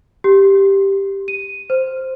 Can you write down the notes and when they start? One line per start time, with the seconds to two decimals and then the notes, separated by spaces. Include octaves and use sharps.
0.24 G4
1.28 D#7
1.70 C5